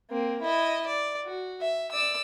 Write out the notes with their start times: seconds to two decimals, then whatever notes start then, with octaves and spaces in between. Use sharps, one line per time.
0.10 A#3 C4
0.42 E4 D#5
0.87 D5
1.24 F#4
1.61 E5
1.91 D5 E6